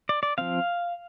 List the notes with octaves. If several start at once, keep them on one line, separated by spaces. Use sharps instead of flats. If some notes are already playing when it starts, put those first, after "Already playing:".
D5
D5
F3 C4 F5